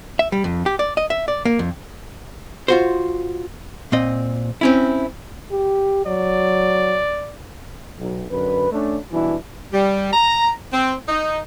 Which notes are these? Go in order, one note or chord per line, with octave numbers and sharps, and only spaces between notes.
E5
G3
F2
G4
D5
D#5
E5
D5
A#3
F2
F4 F#4 C5
A#2 C4 D#5
C4 C#4 E4
G4
F#3 D5
B1
F#2 D3 B4
A3 C#4 D4
G2 B2 E3 D4 E4
G3
A#5
C4
D#4